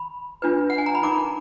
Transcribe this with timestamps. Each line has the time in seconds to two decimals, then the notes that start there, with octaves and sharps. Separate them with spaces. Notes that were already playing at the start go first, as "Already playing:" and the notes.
Already playing: B5
0.42 D4 F4 B4
0.70 F#5
0.78 G#5
0.86 A#5
0.95 B5
1.03 D#4 A#4 A#5 D6